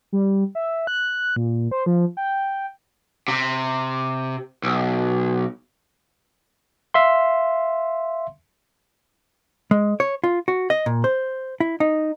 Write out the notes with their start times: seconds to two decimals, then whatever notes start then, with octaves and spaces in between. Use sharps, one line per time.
0.12 G3
0.55 E5
0.87 F#6
1.36 A#2
1.71 C5
1.86 F3
2.17 G5
3.28 C3
4.64 B1
6.94 E5 F5 C6
9.71 G#3
10.00 C#5
10.24 F4
10.48 F#4
10.70 D#5
10.86 A#2
11.04 C5
11.60 E4
11.80 D#4